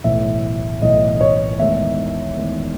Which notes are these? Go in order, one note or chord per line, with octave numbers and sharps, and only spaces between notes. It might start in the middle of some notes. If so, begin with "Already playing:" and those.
B1 A2 E3 E5
B1 A2 E3 D#5
D#5
C#5
E2 D#3 G#3 E5
E2 D#3 G#3